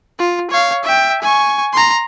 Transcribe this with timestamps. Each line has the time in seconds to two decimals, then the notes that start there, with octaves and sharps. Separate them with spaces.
0.19 F4
0.51 C#5 F5
0.84 E5 G5
1.22 G#5 C#6
1.73 A#5 C6